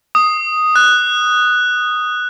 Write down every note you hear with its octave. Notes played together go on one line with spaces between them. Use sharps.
D#6
F#6